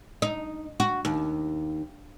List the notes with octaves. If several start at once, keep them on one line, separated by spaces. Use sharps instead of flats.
D#4
F#4
D#2